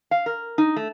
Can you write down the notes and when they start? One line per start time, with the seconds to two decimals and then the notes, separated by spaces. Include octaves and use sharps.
0.11 F5
0.26 A#4
0.58 D#4
0.76 A3